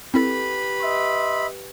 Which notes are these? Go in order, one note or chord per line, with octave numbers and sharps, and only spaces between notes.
C4 E4 G4 A4 B4 B5
D#5 E5 C6